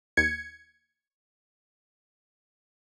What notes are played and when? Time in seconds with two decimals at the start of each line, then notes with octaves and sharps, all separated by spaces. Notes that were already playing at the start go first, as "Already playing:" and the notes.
0.17 D#2 G#6 C#7